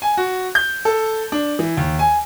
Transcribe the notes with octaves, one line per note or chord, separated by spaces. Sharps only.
G#5
F#4
G6
A4
D4
E3
D#2
G#5